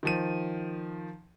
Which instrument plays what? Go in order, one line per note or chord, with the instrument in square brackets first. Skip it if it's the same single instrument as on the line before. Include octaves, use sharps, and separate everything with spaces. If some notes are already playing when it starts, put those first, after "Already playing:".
[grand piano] D#3 F3 D#7